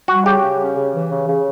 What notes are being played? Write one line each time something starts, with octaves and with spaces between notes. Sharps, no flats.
G3 F#4
C#3 G4
C#3
C#4
C#3
E3
C#3
C#3